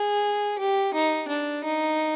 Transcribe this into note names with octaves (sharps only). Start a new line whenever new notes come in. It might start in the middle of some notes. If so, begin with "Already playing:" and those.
Already playing: G#4
G4
D#4
D4
D#4